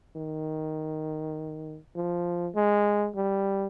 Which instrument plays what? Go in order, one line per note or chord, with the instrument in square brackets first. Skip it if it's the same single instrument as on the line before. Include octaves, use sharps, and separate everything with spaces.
[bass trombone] D#3
F3
G#3
G3